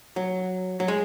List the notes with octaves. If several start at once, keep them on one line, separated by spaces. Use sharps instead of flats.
F#3
F#3
G#3